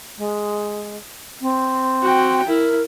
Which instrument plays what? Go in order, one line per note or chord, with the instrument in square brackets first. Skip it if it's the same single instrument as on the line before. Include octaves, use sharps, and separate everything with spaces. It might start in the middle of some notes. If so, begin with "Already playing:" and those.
[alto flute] G#3
C4
[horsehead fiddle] F#4 G5
[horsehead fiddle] E4 [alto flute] A#4